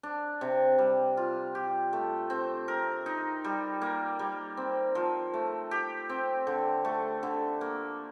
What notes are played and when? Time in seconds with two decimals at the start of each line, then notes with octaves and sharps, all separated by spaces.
0.03 D4
0.41 C3
0.78 G3
1.17 F4
1.55 G4
1.93 A3
2.30 C4
2.68 A#4
3.06 D#4
3.44 G3
3.82 A#3
4.19 G3
4.57 C4
4.95 F3
5.34 A3
5.71 G4
6.09 C4
6.47 D3
6.85 A3
7.23 D3
7.61 A#3